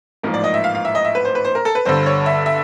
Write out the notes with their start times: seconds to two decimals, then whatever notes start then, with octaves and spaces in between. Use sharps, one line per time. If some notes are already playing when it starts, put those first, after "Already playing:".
0.23 A1 G#2 F3 A#3 A#4
0.34 D5
0.44 D#5
0.54 E5
0.64 F5
0.75 F5
0.85 E5
0.95 D#5
1.05 E5
1.15 B4
1.25 C5
1.35 B4
1.45 C5
1.55 A#4
1.65 A4
1.75 B4
1.85 G1 G2 D3 C5
2.06 C#5
2.26 E5
2.46 E5